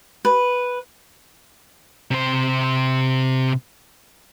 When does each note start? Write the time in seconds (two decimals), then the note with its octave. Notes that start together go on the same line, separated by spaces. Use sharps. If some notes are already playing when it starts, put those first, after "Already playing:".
0.25 B4
2.11 C3 C5